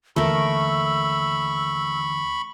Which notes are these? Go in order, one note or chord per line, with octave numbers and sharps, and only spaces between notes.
D#2 D3 E3 A3 A#4 B5 C#6 E6